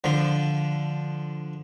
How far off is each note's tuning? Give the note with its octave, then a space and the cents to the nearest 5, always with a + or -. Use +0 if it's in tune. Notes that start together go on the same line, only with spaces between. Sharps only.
D3 +0 F3 +0